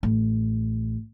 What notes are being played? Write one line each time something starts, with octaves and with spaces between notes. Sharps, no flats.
A1